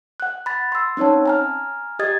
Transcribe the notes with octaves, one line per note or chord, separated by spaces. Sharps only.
F#5 F#6
B5 A6
C6 E6
C4 C#4 D#4 C#5 A5
G#5 A#5 F6
G4 D#5 D#6 G#6 A6